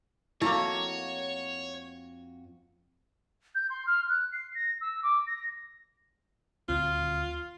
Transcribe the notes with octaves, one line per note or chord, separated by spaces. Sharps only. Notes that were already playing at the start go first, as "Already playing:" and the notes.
F2 A3 A#3 E4 F#4 C#5 A#5
G6
C6
F6
F#6
C7
A#6
E6
D6
A#6
D#1 D2 C4 F4